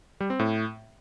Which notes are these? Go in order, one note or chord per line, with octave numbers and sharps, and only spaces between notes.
G3
C4
A2